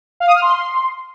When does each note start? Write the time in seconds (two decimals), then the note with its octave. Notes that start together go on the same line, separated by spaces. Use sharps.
0.20 F5
0.27 D#6
0.35 F6
0.42 C6